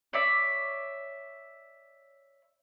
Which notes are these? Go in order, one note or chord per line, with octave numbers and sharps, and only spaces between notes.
C#5 D5 E5